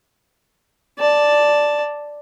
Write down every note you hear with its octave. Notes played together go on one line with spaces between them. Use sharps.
D5 A5